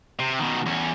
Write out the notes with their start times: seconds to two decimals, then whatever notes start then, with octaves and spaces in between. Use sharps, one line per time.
0.20 C3
0.39 B2 D#3
0.66 E2 C#4